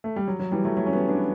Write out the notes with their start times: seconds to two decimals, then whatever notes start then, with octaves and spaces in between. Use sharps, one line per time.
0.04 A3
0.16 G3
0.28 F#3
0.39 F#3
0.52 E3 G3
0.65 F#3 A3
0.76 F#3 A3
0.86 C#4
0.92 G3 B3
1.08 B3 D4